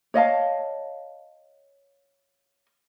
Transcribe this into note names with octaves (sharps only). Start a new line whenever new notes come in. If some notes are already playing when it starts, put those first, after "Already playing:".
C#5 D#5 F5 A5